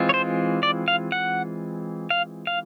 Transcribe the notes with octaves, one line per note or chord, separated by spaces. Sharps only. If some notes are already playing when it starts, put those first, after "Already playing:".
Already playing: E3 G#3 C4 F4
C#5
C5
D5
F5
F#5
F5
F5